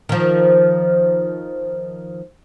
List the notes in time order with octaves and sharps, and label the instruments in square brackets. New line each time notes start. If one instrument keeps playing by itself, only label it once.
[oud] D#3 F3